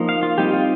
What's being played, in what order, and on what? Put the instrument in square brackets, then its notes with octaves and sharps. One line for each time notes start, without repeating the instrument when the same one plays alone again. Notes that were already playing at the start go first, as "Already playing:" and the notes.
Already playing: [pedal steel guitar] F3 A#3 D#4
F5
F4
G3 C4 D#4 G4
F4